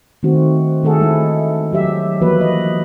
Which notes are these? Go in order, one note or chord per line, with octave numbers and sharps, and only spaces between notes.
D#3 A3 C4 F#4
D#3 A3 G#4 A4 F#5
G#3 E4
F#3 G4 E5
E3 F3 A#3 F#4 B4
D#5